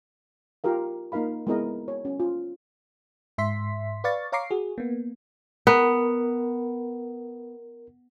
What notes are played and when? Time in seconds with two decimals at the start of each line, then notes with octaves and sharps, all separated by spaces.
0.64 F4 G4 A#4 F5
1.12 A#3 D#4 A#4 F5 B5
1.47 G#3 B3 C4 E4 A#4 D#5
1.88 C#5
2.05 C#4
2.20 F4
3.38 G#2 E5 C6 B6
4.04 B4 D5 F5 C#6 A6
4.32 C#5 F5 A#5 C#6 D6 C7
4.51 F#4 G#4
4.78 A#3 B3
5.67 B3 A#4